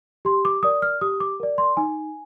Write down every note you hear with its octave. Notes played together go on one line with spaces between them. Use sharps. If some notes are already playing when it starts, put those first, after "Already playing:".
G4 C6
D6
A#4 D5 D#6
F6
G4 D#6
D6
A#4 D5
C6
D#4 G#5